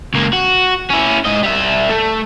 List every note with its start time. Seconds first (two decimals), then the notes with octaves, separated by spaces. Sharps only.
0.14 C#2 A#3
0.33 F#4
0.90 C#4 E4
1.25 G#2 D#5
1.43 G3 E5
1.90 A3